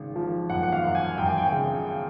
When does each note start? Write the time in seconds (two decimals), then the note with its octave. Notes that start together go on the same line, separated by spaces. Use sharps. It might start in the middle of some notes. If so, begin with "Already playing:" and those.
Already playing: G#1 C#3
0.16 F3
0.50 F#2 F#5
0.63 F#5
0.72 F5
0.83 F#2
0.95 G#5
1.18 F#2 G5
1.27 G#5
1.38 G5
1.52 C#3